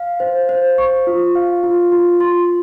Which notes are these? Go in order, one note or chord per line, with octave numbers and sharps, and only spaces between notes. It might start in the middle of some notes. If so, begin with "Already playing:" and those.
Already playing: F5
C5
C5
C#6
F4
F5
F4
F4
C6